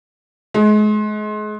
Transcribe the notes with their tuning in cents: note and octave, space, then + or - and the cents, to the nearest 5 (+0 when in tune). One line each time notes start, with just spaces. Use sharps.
G#3 +35